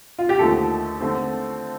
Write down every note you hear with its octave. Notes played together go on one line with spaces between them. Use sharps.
F4
G4
D#2 D3 F3 A3 A4
D3 A3 C4